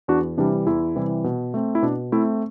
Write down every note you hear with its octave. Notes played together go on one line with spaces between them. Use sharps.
E2 D4 F#4
C3 E3 G3 D4
E2 E4
C3 E3 G3
B2
A3 C4
E4
B2 D4
A3 C4 E4